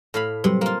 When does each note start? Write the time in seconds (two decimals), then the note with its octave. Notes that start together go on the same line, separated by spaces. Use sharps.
0.14 A2 F5 B5
0.44 C3 F#3 G3 B4
0.61 A#3 F4